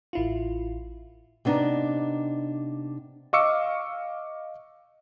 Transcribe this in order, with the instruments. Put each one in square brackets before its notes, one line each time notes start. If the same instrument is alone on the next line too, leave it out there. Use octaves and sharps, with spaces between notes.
[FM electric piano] A1 E4 F4
[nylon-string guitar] C3 B3 D4 D#4
[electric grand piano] D#5 F5 C#6 D6 E6 C#7